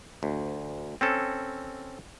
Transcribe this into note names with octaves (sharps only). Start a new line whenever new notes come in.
D2
C4 C#4 A4